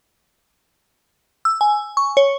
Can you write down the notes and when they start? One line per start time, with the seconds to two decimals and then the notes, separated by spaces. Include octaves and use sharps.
1.45 E6
1.61 G#5
1.97 C#6
2.17 C#5